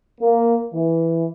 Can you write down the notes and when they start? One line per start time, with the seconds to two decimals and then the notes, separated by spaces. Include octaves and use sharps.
0.21 A#3
0.74 E3